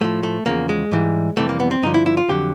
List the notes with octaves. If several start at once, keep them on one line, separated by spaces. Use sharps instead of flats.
A2 F3 A3
A3
E2 C#3 F3 A#3
G#3
G#2 E3 G3
F2 C3 E3 G3 A3
A#3
B3
C4
G2 D3 F3 D#4
E4
E4
F4
F2 D3 F#3 G4